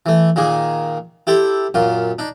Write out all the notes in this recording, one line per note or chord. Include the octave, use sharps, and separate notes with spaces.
E3 A3
A#2 D#3 A#3 G#4
E4 G4 A4 C5
F#2 A#2 F4
D4 D#4